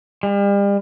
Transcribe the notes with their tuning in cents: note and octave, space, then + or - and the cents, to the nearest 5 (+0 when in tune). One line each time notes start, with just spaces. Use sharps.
G3 +40